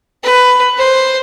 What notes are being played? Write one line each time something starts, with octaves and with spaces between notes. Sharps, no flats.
B4
C5